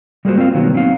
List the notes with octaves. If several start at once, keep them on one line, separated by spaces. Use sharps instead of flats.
G3 G#3 A#3 F4 F#4 C5
C4 F4 A#4 F5
B2 D#3 F#3 A#3 B3
F#3 C4 D#4 F5